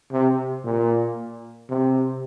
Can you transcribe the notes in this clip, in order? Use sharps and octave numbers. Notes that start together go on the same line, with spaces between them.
C3
A#2
C3